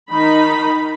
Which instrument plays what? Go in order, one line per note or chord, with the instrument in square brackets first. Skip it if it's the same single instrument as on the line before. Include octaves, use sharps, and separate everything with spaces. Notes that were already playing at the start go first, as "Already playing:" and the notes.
[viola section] D#3 D#4 B5